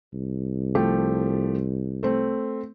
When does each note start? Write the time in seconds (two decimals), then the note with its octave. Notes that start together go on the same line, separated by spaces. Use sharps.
0.13 C2
0.75 F3 A3 G4
2.03 A3 C4